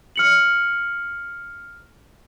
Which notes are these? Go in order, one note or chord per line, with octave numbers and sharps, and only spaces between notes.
F6 C#7 F#7